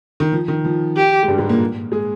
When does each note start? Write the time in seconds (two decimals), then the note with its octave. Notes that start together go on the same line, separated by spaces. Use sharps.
0.20 D#3
0.32 F3
0.48 D#3
0.65 F3
0.96 G4
1.23 G#3
1.28 G2 G3
1.38 G#2 G#3
1.49 A#2 A#3
1.92 G#3 G#4